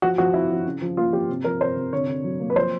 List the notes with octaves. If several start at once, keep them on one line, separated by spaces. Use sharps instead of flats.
F3 F#4
F3 F#4
C4 E4
F3
C#3
F3
A#3 F4
F3 G4
C3
F3 A#4
C3 C5
C3
D3 C#5
D3
F#3
A#3
B4
F3 C5